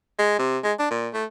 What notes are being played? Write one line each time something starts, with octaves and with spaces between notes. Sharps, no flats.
G#3
C3
G#3
D4
A#2
A3